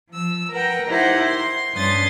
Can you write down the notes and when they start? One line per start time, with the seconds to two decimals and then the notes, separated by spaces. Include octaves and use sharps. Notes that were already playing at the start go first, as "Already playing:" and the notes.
0.10 F3 E6
0.52 A#4 B4 F#5 G5
0.88 D#4 E4 G4 A#4 C5 F#5
1.26 C6
1.75 G2 C#4 B4 C6 D#6 A6